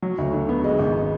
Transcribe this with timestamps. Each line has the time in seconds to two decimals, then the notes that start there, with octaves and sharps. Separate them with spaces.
0.02 F#3
0.18 D2
0.33 D3
0.49 B3
0.64 G#3
0.79 G#1